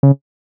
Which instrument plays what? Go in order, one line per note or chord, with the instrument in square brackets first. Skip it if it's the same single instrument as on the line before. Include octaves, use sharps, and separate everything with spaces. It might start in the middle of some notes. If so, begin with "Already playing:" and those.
[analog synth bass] C#3